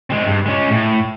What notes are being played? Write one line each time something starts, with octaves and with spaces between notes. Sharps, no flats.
G#3 C4
G2
G#3 C#4
A2